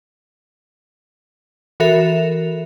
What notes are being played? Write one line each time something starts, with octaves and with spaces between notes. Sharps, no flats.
E3 F#4 A4 A#4 E5 F7